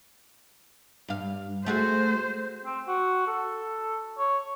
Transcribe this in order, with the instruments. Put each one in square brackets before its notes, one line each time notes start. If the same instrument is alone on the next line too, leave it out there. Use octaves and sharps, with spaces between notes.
[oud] G2 F5
[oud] A3 F#4 G#4 [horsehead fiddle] C5
[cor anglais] C4
F#4
A4
C#5